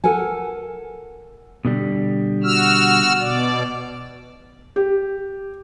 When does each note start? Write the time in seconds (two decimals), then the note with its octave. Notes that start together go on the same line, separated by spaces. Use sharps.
0.04 A4 A#4 F#5 G#5
1.65 B2 D3 G3
2.44 F#4 E6 F6
3.19 B2 D5
4.76 G4